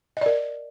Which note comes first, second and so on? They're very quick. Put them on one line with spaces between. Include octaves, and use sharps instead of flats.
D#5 D5 A#4